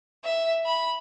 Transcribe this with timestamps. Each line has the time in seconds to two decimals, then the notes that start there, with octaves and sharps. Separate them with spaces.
0.23 E5
0.65 B5